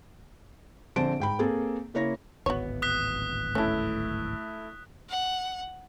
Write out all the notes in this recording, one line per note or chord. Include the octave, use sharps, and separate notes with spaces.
A#1 D3 C4 C5 A5 D7
G#2 G5 B5
A#3 C4 G#4 A4
C#3 A#3 E4 C#5 A#6
D1 G#1 B3 F#4 C#5
D#6 F#6 B6
A3 C#4 E4 A4
F#5